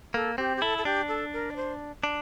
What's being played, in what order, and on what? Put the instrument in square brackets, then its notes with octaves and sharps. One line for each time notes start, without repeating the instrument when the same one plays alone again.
[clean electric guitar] A#3 [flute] A4
[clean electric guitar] C4 [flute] G4
[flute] G4
[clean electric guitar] E4 [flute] A4
[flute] A4
[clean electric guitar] D4 [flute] G4
[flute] A4
A#4
D5
C5
[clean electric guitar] D4